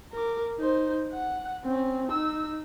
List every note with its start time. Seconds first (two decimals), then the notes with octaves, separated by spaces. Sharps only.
0.12 A#4 D6
0.58 D#4 C5
1.12 F#5
1.64 C4 C#4
2.08 D#4 E6